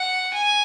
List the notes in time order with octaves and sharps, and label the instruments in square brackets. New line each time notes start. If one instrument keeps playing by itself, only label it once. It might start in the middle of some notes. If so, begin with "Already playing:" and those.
Already playing: [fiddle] F#5
G#5